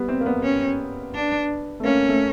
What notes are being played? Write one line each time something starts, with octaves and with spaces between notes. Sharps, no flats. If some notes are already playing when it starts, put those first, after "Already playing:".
Already playing: G3 B3
C4
A#3
B3
C#4
D4
A3
A#3 C#4
A3